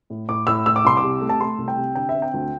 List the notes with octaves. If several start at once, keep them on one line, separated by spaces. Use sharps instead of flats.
A2
A2 D6
A2 E6
A2 E6
D6
C2 C6
D6
C3
A3
A5
A3 C6
C2
G5
C3
D3 G5
E5
C4
G5
D2